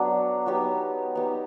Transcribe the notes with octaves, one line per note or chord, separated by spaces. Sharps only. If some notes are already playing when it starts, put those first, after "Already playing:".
Already playing: F#3 B3 D4 F#4
F#3 B3 D#4 G4
B3 D#4 G4